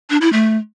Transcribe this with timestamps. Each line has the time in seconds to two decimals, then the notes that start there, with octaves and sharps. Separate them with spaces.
0.10 D4
0.21 E4
0.33 A3